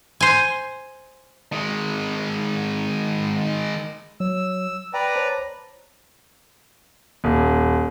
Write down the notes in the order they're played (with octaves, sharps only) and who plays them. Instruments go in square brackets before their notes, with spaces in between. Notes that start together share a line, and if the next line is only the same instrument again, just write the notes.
[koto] C5 G#5
[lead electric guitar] D#3 G#3
[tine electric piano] F#3 C#5 [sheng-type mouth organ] E6
[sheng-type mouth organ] B4 D5 A#5 [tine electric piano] G5
[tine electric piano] C5 C#5 A5
[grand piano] D#1